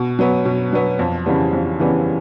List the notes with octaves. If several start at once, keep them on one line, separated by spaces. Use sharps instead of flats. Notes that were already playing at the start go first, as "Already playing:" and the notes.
Already playing: B2
F#3 B3
B2
F#3 B3
F2
C#3 E3 G3 B3
F2
C#3 E3 G3 B3